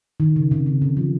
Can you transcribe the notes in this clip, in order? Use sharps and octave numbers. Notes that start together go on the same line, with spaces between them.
D#3
C#3
C3
C#3
D3
F3